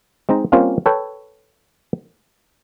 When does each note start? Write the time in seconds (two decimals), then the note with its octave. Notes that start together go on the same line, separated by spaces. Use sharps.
0.29 G#3 C4 D#4 A#5
0.52 G3 A#3 C4 C#4 F4
0.86 A4 B4 C#5 G5